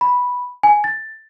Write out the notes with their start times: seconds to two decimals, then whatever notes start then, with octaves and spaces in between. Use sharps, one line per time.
0.01 B5
0.63 G#5
0.84 A6